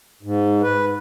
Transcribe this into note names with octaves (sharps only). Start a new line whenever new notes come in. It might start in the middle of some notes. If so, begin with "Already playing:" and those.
G#2
B4